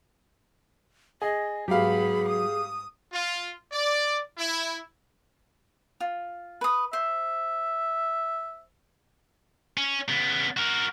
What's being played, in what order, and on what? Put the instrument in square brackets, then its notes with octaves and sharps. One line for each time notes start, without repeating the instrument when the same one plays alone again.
[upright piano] G#4 [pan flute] D#5
[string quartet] G#2 B3 B5 [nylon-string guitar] F#3 [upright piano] G4 F5 [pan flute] G#4
[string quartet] D#6
[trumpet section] F4
D5
E4
[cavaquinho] F4
B4 D#6
[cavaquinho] C5 [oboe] E5
[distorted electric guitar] C#4
C#3 B3
F#4 A#4